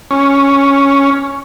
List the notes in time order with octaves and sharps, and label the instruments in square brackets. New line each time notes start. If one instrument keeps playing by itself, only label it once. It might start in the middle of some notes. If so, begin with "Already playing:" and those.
[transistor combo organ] C#4